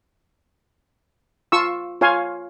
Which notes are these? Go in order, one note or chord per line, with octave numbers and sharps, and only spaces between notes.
F4 C#6 E6
F4 C#5 F5 G#5 C6